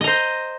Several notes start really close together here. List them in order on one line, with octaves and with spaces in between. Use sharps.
D#5 A#5 C5